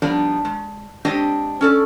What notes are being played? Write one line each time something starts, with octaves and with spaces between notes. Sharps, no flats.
F3 G3 B3 D4 D#4 D5
G#3
G#3 C4 D4 G4 C5 D#5
C#4 A4 D5